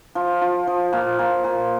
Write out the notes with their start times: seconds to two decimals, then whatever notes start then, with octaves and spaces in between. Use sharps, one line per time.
0.15 F3
0.42 F3
0.67 F3
0.93 A#2
1.19 A#2
1.44 A#2